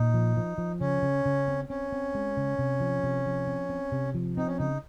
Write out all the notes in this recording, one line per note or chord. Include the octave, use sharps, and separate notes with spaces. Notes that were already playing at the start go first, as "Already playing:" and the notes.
Already playing: A#2 D#4
F3
F3
F3
C#3 C#4
C#3
C#3
C4
C4 C#4
C4
G#3
C#3
C3
F3
C3
F3
C4
C4
C3
F3
C4 D#4
C#4
C#3 D#4